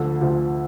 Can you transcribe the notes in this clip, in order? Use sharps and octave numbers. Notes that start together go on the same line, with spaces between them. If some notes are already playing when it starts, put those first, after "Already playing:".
Already playing: D2 D3 F3 A4
D2 D3 F3